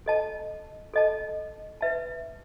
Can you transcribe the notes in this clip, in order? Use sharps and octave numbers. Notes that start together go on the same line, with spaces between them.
A4 D#5 A5
A4 D#5 A5
B4 E5 A5